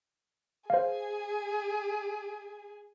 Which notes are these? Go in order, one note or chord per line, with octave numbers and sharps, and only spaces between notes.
G#4 C5 F5